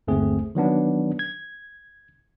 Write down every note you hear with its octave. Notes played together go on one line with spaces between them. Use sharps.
G1 D#2 A3 C4 G#4
D#3 F#3 B3 D4
G#6